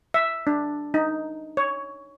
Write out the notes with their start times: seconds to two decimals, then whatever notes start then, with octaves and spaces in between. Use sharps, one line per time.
0.14 E5
0.47 D4
0.94 D#4
1.57 C#5